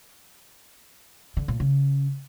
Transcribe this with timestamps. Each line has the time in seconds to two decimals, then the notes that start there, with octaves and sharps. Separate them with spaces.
1.37 D3
1.48 A#2
1.60 C#3